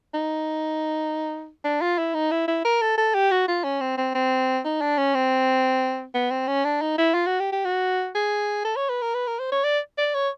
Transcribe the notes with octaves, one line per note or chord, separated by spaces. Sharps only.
D#4
D4
F4
E4
D#4
E4
E4
A#4
A4
A4
G4
F#4
F4
C#4
C4
C4
C4
D#4
D4
C#4
C4
B3
C4
C#4
D4
D#4
E4
F4
F#4
G4
G4
F#4
G#4
A4
C#5
B4
A#4
B4
A#4
C5
C#5
D5
D5
C#5